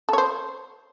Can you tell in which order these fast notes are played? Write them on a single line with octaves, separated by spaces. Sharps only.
A4 C#5 C5